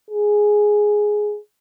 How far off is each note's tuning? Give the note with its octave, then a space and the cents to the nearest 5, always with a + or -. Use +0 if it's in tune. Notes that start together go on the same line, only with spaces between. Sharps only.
G#4 +5